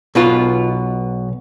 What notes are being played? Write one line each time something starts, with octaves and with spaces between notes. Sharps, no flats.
B1 B2 B3 F4